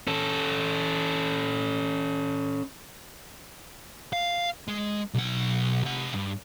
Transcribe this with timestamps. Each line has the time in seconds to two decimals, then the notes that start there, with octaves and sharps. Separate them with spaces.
0.07 C#4 A4
4.13 F5
4.68 G#3
5.14 B1 F#5
5.84 C3 F#5
6.14 G2